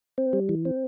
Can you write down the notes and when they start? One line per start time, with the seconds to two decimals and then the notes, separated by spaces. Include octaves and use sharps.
0.18 C4
0.33 G3
0.49 E3
0.65 C4